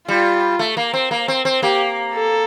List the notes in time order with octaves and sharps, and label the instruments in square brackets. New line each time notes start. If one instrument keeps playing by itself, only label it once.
[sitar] G3 [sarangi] F4
[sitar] A3
A#3
C4
A#3
C4
C4
[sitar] A#3 [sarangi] G4
[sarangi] A4